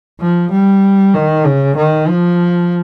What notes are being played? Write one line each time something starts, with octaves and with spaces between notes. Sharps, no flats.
F3
G3
D#3
C#3
D#3
F3